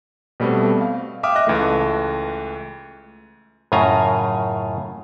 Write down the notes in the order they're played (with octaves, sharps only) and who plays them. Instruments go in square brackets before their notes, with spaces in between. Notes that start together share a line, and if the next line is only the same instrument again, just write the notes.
[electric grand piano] B2 G3 A3 B3 C4
F5
E5 F5 G5 D6 D#6 F6
D#5 F#6 A#6
C#2 E3 A3
[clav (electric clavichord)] F#2 A2 C#3 F4 G#5 A#5